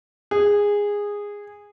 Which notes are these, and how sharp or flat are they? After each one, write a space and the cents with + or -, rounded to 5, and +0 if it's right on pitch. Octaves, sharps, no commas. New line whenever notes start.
G#4 -15